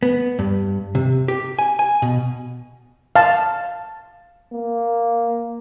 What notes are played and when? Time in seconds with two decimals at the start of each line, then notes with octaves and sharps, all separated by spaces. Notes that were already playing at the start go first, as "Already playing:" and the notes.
0.03 B3
0.39 G2
0.95 C3
1.28 G4
1.59 G#5
1.79 G#5
2.02 B2
3.16 F5 A5
4.53 A#3